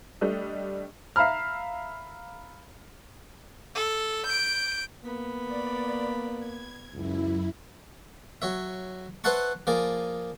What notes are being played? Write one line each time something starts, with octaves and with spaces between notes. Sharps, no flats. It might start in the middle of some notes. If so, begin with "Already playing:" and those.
G3 A3 D4 D#5
E5 F5 A#5 B5 F6
A4
G6 D7
A#3 B3 B5
D5
G#6
C#2 F#2 E4
F#3 C#5 E5
B4 C5 E5 F#5 A5 C#6
F3 A#3 G#4 D5